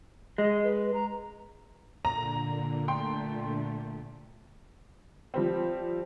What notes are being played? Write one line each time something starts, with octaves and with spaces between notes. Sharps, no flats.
G#3 D#5
B4
A#5
A#2 D3 A#5
A3 G5 C6
F3 G3 C4